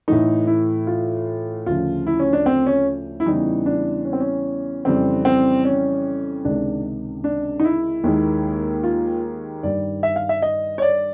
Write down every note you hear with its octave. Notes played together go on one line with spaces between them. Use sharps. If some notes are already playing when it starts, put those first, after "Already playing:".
A2 E3 A3 D#4
E4
F4
D2 C#3 F3 F4
E4
C#4
D4
C4
C#4
E4
E2 C#3 E3 G3 D#4
D4
C#4
C4
C#4
F2 C#3 E3 G3 C4
C4
C#4
C#2 C3 D#3 G#3 D4
D4
D#4
E4
D#2 D#3 G#3
F4
G2 D#3 G3 D5
E5
F5
E5
D#5
C#5
D5